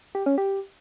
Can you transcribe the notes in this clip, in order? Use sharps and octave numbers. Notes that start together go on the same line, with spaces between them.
G4
C#4
G4